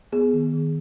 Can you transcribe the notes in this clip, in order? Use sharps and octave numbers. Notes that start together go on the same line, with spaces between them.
B3 G#4
D#3
D#3